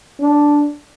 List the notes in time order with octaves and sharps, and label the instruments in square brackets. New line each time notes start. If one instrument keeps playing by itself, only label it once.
[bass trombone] D4